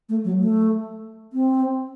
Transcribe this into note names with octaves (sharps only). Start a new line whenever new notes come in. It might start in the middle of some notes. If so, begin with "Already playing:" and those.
A3
F#3
A3
C4